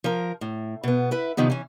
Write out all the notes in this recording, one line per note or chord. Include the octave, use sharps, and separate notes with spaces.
F3 A#4
A2
B2 B3
E4 B4 E5
C3 D#3 F3 B3
E3 C#4